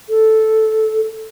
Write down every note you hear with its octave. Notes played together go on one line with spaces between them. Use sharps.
A4